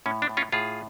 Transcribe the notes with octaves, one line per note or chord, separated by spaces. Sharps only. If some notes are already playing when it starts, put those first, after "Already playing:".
A2 C#4
D4
A2
C#4 F4
A2 F4 G#4